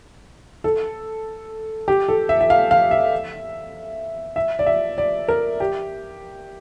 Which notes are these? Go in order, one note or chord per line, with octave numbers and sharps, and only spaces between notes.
A4
G4
A4
E5
E5
F5
F5
E5
E5
D5
E5
D5
A#4
G4